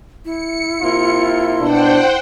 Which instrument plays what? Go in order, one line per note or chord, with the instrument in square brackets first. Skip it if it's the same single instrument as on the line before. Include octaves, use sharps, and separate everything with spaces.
[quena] E4 [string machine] C#7
[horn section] C3 A#3 F4
[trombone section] B2 D4 [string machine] C5 F#5 G5